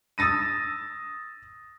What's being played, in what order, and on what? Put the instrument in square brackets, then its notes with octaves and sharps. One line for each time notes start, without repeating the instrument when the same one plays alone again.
[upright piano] D#6 E6 A6 A#6 D#7